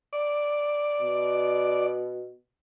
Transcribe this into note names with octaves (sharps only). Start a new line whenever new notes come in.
D5
B2